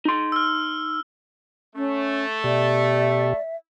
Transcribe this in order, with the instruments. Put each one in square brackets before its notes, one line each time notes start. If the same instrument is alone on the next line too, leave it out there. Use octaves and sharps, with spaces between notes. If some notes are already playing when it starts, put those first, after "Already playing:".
[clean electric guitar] D#4 C6
[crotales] E6 F6
[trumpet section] A3 A4 [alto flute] C#4
[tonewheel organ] B2 G4 [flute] D5 [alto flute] E5